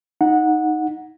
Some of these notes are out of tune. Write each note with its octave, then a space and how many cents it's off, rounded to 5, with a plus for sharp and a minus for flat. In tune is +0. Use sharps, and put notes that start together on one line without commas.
D#4 +0 F#5 -15